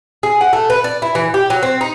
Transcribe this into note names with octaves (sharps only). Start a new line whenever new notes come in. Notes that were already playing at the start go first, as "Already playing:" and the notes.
G#4
F#5
A3
B4
D5
E4
E3
G4
F#3
C4
D#4